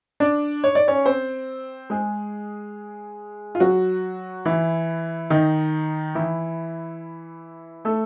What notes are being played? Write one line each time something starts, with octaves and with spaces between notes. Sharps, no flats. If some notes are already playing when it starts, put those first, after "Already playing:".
D4 D5
C#5
D5
C#4 C#5
C4 C5
G#3 G#4
F4
F#3 F#4
E3 E4
D#3 D#4
E3 E4
A3 A4